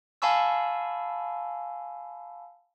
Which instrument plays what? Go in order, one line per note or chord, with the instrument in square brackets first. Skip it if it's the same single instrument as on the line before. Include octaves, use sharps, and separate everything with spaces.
[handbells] F5 G#5 A5 B5 C#6 E6